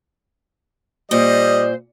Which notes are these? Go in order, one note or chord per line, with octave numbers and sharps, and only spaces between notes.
A#2 G3 C5 D5 D#5